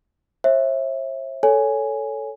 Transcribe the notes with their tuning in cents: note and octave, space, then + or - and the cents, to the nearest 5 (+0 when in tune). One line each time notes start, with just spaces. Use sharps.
C5 +45 E5 +0
A4 +0 C#5 +10 G#5 +0